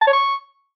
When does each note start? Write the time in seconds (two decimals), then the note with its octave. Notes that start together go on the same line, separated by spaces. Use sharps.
0.01 A5
0.07 C#5
0.13 C#6